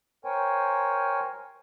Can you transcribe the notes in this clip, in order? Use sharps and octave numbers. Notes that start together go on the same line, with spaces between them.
A#4 C5 C#5 G5 G#5